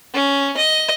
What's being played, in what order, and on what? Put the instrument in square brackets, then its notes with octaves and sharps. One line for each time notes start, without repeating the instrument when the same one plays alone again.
[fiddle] C#4
D#5